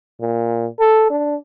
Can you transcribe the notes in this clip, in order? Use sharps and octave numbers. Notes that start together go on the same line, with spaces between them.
A#2
A4
D4